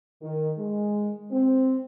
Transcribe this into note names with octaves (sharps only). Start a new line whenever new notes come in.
D#3
G#3
C4